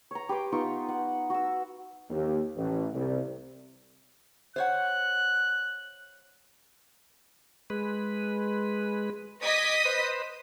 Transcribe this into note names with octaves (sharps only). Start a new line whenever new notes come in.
C#5 A#5
G4 B4 C6 D6
B3 D#4 F4 C#6
F#5
F#4 E6
D#2
A1
C2
C5 C#5 F#5 F#6
G#3 B4
D#5 D6 D#6 G#6 B6
B4 C5